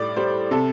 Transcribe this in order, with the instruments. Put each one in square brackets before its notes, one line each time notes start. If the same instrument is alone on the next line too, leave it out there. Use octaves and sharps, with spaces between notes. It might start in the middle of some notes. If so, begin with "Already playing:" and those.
Already playing: [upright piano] A2 G3 D5
G3 C5
C3 A4